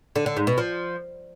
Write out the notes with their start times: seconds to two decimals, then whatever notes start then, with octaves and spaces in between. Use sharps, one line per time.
0.16 D3
0.26 D3
0.37 G#2
0.47 B2
0.58 F3